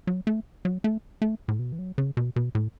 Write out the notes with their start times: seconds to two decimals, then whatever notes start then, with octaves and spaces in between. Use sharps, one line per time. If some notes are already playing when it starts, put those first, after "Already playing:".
0.07 F#3
0.27 A3
0.65 F#3
0.84 A3
1.22 A3
1.48 A2
1.59 B2
1.72 E3
1.79 F#3
1.98 C#3
2.17 B2
2.36 B2
2.55 A2